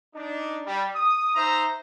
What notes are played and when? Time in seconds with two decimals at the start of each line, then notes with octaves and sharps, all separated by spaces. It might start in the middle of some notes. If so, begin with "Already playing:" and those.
0.15 D4 D#4
0.65 G3
0.95 D#6
1.35 D#4 C5 E5 A#5